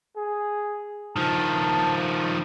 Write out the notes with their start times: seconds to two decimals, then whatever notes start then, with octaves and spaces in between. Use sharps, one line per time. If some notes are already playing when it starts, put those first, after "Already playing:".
0.16 G#4
1.16 D#3 F3 A5